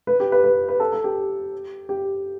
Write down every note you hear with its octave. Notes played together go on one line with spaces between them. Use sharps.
B4
G4
B4
B4
B4
A4
A4
G4
G4